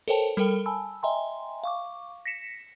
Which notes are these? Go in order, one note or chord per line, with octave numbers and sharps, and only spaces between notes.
A4 A#4 C5 C#5 G5 A5
G3 A4 A#4 G5 G7
G#5 A5 B5 E6
D#5 E5 G5 G#5 A#5 C6
F5 C#6 D6
A#6 B6 C#7 E7